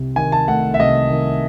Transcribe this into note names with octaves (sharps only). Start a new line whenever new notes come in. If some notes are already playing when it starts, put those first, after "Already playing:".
Already playing: C2 C3
D#3 G#5
A5
A3 F#5
E5
C2 D#5
D#3